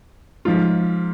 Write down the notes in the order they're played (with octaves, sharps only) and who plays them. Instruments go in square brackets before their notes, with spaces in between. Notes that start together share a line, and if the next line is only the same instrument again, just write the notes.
[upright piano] G#2 F3 F4